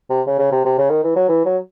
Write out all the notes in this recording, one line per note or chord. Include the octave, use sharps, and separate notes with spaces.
C3
C#3
C#3
C3
C3
C#3
D#3
E3
F#3
E3
F#3